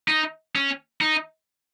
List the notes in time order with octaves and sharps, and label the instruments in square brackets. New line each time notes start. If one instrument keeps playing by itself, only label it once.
[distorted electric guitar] D#4
C#4
D#4